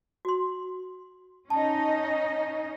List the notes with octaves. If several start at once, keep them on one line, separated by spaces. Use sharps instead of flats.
F#4 C6
C#4 D#4 D#5 A5